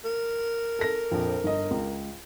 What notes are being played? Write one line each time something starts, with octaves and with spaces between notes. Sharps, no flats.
A#4
A4 A#6
A#1 F2
G1 D#5
C#2